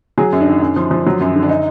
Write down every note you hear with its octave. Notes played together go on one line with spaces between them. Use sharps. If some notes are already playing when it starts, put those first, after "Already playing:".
F#3 G#4
F#2
D4
D#3
F#2
F3
F3
F#3
F#2
D3
D4
D#4